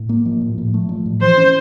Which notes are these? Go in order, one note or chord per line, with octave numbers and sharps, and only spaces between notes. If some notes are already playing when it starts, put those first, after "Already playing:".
Already playing: A2
A#3
F3
A2
A2
A3
F3
A2
E3 C5
C#4